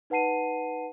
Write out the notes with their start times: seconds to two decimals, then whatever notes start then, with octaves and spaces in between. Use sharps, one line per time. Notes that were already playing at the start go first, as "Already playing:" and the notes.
0.10 D#4 B4 F#5 A5 C7 D#7